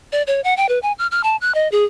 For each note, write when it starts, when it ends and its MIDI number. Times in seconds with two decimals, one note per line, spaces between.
0.12 0.23 74
0.27 0.41 73
0.44 0.56 78
0.57 0.68 79
0.69 0.79 71
0.83 0.92 80
0.99 1.07 89
1.11 1.22 89
1.24 1.36 81
1.41 1.54 90
1.55 1.70 75
1.72 1.85 68